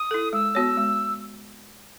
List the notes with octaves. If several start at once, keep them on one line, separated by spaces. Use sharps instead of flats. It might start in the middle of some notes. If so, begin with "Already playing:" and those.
Already playing: D#6
E4 A4
G#3 E6
B3 F#4 C#5
G#3